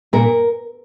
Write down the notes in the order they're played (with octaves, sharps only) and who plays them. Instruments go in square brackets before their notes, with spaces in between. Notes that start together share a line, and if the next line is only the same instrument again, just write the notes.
[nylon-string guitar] A#2 A#4